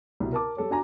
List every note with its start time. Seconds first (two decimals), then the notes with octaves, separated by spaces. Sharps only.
0.20 C2 B2
0.33 A#4 A5 D6
0.57 G3 A4 C#5
0.70 D4 F#4 G#5 A#5